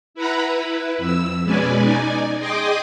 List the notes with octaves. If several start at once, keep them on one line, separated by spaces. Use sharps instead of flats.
E4 B4 F#5 A#5 B5
E4 B4
F2 E6
B2 G#3 C#4 B4 D5 G#5
D#4 D5 G#5
G#4 D#5 G5 C6 D6 D#6